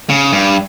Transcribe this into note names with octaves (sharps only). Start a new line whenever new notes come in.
C#3
G2